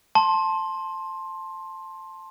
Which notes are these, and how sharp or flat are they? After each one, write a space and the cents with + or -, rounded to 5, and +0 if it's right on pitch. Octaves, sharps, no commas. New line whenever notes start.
A5 +0 C6 +15